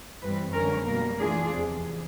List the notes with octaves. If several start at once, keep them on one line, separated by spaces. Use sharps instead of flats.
G2 E3 G3 C4 B4
F#2 D3 F3 G#3 C#4 A#4
B2 G3 A#3 A#4
E3 A3 D4 F4 G#4
E2 C3 F3